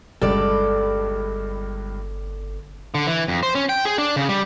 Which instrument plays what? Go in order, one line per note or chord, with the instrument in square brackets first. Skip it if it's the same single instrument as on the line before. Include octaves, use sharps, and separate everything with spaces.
[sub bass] G1 [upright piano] C#2 G2 [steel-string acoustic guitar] A4 D5
[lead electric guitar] D3
E3
F2
C5
C#4
G5
G#4
D4
C#3
G3